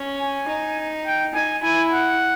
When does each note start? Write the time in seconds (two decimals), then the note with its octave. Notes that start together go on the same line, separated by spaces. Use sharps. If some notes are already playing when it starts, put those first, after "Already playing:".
Already playing: C#4
0.19 G#5
0.48 D#4
1.06 G5
1.34 D#4 G#5
1.62 E4 G#5
1.91 F#5